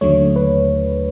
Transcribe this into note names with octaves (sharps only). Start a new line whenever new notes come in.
D#2 D3 F#3 A3 C#5
B4